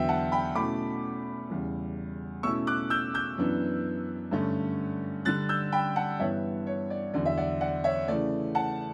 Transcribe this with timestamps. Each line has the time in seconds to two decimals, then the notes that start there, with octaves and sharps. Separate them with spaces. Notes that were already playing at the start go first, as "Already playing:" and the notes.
Already playing: E2 D3 F#3 B3 E5 G5
0.09 F#5 A5
0.32 G5 B5
0.55 B2 A3 C#4 E4 B5 D6
1.50 E2 C#3 G3
2.43 B2 A3 C#4 E4 C#6 E6
2.67 D6 F#6
2.90 E6 G6
3.14 E6 G6
3.38 F#2 E3 B3 D4
4.31 G2 D3 A3 C#4
5.25 D3 G3 D4 F#6 A6
5.49 E6 G6
5.72 G5 B5
5.96 F#5 A5
6.19 G2 E3 B3 C#5 E5
6.67 C#5
6.90 D5
7.14 E2 D3 F#3 D5
7.25 E5
7.37 D5 F#5
7.61 D5 F#5
7.84 C#5 E5
8.08 C#3 E3 A3 D5
8.55 F#5 A5